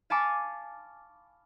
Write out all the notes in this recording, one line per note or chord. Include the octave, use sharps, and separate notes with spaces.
F5 G#5 A5 B5 C#6 D6